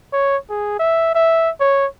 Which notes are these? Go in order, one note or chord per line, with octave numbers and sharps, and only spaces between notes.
C#5
G#4
E5
E5
C#5